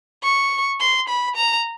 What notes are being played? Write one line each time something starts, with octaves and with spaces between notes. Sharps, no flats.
C#6
C6
B5
A#5